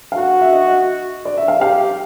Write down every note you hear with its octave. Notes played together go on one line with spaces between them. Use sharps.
F5
F#4 F#5
E5
D#5
D5
E5
F5
G4 F5